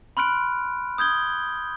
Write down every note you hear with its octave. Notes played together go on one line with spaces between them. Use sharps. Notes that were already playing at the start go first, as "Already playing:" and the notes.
B5 C6 F6 F#6 D7
D#6 G6 G#6 G7